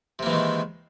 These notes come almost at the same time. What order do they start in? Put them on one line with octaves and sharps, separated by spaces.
C3 A#3 E3 G#3 D#3